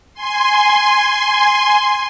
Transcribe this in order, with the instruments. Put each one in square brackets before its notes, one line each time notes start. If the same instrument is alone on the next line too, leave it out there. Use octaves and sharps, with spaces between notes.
[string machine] G#5 C6